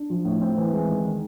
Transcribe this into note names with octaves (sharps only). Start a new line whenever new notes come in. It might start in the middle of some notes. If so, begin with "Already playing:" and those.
Already playing: D4
F3
A2
C4
E3
G#3
D#3
D#3